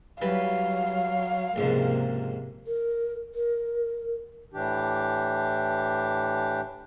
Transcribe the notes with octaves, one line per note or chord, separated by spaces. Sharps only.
E3 F#3 G3 B4 F5
C#2 G#2 C3 F3 A#3
A#4
A#4
A2 E3 D4 G4